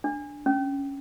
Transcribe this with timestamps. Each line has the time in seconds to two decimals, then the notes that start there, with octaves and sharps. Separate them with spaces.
0.04 D4
0.46 C#4